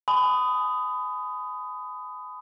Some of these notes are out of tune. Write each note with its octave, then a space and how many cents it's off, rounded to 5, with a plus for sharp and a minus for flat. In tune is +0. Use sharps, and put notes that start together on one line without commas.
G#5 +30 B5 +30 D#6 +0